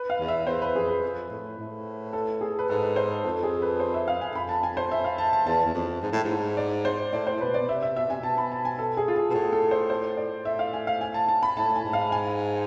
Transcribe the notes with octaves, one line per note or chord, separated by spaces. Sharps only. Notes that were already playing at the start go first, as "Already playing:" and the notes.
Already playing: B4
F5
E2
E5
E2 C5
B4
F2 G#4
B4
F2
A2
A2
A4
G#4
B4
G#2 A4
B4
C5
F2 A4
G#4
B4
C5
E5
F5
G#5
F2 B5
A5
G#5
C5
E5
F5
A5
A5
E2 A5
E2
F2
G#2
A2
G#2
D5
C5
A2 D5
C5
A2
B2 B4
D5
B2
C3 E5
E5
B2 E5
C3 G#5
B2 A5
B5
A5
G#5
A4
G#4
F4
G#4
B2
A2 G#4
A4
C5
C5
D5
A2 E5
F5
G#5
F5
G#5
A5
A5
B5
A2 A5
G#5
G#2
F5
G#5